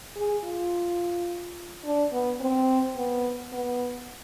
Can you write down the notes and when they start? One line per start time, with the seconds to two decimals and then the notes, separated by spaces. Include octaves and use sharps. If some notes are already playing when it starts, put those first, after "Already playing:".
0.16 G#4
0.44 F4
1.85 D4
2.12 B3
2.40 C4
2.97 B3
3.52 B3